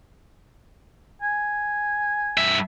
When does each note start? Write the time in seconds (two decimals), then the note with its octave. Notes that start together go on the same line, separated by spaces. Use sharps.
1.22 G#5
2.37 G2 E5